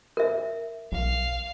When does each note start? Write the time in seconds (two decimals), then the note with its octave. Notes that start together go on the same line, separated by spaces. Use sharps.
0.17 A#4 E5
0.92 B1 F5